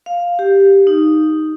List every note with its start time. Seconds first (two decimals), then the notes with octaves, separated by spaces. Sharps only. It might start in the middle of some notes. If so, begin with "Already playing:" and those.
0.06 F5
0.39 G4
0.87 D#4